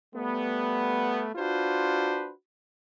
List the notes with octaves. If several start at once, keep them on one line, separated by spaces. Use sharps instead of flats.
G3 A3 B3
D4 F4 F#4 B4 C5